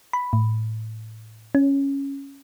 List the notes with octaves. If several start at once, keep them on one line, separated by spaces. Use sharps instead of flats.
B5
A2
C#4